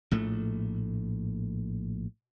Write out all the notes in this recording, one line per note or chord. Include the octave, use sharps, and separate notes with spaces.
A#1 A2 A3